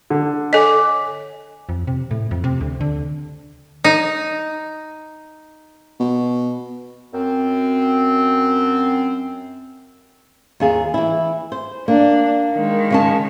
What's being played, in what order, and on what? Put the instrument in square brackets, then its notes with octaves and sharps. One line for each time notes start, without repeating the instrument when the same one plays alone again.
[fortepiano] D3
[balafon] A4 D#5 [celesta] C#5 G#5 D6
[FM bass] F2
C3
A2
F2
C3
D2
D3
[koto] D#4
[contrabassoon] B2
[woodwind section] F#2 C4
[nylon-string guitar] D#2 F4 G#4
E3 E4
C5
[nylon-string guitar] A#3 [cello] D4
[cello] D#3 G#3
[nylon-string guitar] C#3 C#4 A5